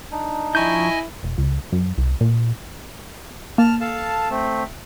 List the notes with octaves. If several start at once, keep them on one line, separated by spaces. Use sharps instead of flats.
D4 D#4
F3 E4 D#5 G#5 C#6 G6
E1
C#2
F#2
C2
A#2
A#3 A5 F6
A4 F5 A5
A3 C4